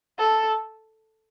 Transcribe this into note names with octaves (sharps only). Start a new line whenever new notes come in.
A4